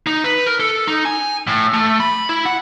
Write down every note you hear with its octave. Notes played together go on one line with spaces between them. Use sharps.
D#4
B4
A#4
A4
D#4
G#5
A2
A3
B5
E4
F#5